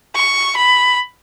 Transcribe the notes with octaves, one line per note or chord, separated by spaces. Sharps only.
C#6
B5